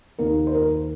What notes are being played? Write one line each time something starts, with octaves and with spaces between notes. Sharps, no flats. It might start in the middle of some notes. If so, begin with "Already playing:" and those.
D#2 D#3 A#3 A#4
C5
A#4